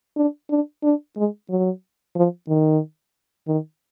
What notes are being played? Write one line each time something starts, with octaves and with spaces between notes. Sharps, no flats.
D4
D4
D4
G#3
F#3
F3
D#3
D#3